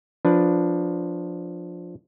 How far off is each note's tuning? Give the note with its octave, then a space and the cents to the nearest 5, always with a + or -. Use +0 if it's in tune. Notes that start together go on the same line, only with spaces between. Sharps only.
F3 +10 D4 +0 B4 +0